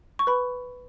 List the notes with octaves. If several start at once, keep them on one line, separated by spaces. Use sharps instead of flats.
C#6
B4 B5